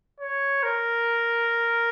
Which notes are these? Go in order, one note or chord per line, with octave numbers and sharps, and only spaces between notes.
C#5
A#4